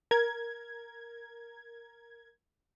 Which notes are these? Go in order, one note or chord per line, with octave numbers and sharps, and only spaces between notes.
A#4 G#6